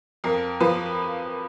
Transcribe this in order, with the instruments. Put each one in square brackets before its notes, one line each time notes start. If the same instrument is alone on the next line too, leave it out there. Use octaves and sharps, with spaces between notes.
[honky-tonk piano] F2 A#4
F3 B4